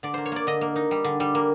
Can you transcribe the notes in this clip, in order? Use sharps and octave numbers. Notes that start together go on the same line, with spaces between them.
D3 D5
A#3 C5
C#5
A#3 D5
D3 D#5
A#3
D#4
G3
D3
G3
A#3